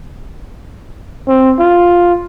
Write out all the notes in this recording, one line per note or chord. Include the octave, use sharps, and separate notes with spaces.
C4
F4